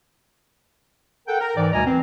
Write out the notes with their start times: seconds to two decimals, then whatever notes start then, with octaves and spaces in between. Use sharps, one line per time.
1.28 A4 A#4 F#5 G5
1.41 A#4
1.57 G#2 E3 D5
1.73 D2 B2 G3 D#5 G#5 A#5
1.87 E3 C4